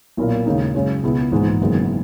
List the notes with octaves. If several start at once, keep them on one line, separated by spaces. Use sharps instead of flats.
B1 A#2 A#3 E4 A#4
D#2 C#3 G#3 D#4
F#2 C#3 G#3 C#4 G#4
C#2 B2 G#3 B3 E4
A#1 G#2 E3 G#3
F#1 F#2 D#3 G#3 B3